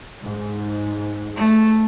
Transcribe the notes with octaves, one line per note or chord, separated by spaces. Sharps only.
G#2
A3